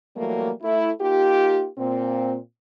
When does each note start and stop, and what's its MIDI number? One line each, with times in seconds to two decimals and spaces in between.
0.16 0.50 52
0.16 0.50 54
0.16 0.50 55
0.16 0.50 57
0.16 0.50 58
0.62 0.90 57
0.62 0.90 64
1.00 1.67 58
1.00 1.67 63
1.00 1.67 65
1.00 1.67 67
1.78 2.37 46
1.78 2.37 60